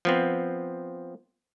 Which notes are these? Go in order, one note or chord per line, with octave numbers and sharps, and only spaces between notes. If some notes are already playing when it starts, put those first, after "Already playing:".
F3 B3 C4